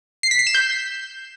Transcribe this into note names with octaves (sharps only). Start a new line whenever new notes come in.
C7
B6
C7
E7
G6